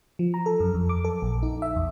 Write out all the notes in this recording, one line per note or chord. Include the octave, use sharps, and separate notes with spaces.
F3
A#5
A4
F#2
F2
D6
A4
A#1
D#4
E5
E2